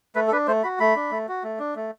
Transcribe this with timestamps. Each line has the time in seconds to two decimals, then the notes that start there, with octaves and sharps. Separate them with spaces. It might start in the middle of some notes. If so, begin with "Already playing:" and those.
0.15 A3 B4
0.27 A4
0.32 D4 B4
0.47 A3 C5
0.63 F#4 B5
0.80 A3 B5
0.96 D4
1.11 A3
1.28 F#4
1.44 A3
1.59 D4
1.76 A3